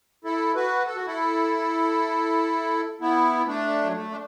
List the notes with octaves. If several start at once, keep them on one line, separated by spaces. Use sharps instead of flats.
E4 A4
F#4 B4
A4
F#4
E4 A4
B3 E4
A3 D4
F#3
A3
D4